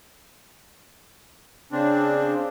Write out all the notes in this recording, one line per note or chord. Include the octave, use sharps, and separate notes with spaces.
C#3 C4 D4